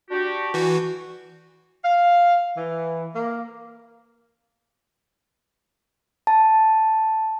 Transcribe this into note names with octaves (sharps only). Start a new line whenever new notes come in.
D4 F#4 G4
E3 F#4
F5
E3
A#3
A5